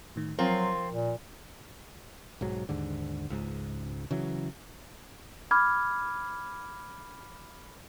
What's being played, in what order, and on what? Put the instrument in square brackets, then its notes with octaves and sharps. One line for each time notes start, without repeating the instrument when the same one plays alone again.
[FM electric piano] A2 D#3
[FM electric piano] F3 A#4 [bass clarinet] F#3 [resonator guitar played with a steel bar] C4 F4
[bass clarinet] A#2
[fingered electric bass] B1 G#2 F#3
D#2 G#2 D3
C#2 G#2
C#3 E3 F#3
[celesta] B5 D6 F6 G#6